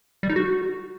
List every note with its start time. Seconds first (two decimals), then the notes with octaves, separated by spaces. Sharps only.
0.23 G3
0.29 D#4
0.36 F#4